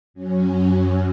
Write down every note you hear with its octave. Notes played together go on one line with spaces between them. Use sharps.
F#2 F#3 C#4